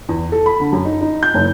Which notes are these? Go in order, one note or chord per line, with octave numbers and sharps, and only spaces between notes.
E2
A4
B5
D3
F#2
D#4
D#4
G6
F#1